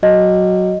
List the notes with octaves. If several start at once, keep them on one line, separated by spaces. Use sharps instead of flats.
F#3 D#5